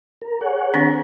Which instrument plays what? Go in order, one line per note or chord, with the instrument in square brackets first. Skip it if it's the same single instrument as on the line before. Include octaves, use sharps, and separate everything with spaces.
[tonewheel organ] A#4
G#4 C#5 F#5
[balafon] D#3 C4 D4